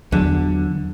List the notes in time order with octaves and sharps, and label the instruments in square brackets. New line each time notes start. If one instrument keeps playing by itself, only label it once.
[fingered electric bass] E2 F#3 [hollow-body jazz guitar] D3